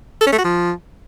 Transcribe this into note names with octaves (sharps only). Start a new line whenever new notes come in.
A4
C#4
A3
F#4
F3